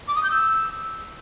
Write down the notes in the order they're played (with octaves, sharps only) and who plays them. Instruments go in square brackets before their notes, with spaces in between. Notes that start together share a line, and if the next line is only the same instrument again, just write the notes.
[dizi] D6
D#6
G6
E6